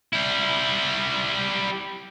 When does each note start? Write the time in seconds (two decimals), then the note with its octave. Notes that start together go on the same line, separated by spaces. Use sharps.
0.13 G3 E4